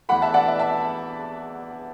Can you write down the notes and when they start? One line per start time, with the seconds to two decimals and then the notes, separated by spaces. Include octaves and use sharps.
0.09 E2 E3 A3 F#5 B5
0.22 E5 A5
0.34 D5 F#5
0.48 E5
0.59 E5 A5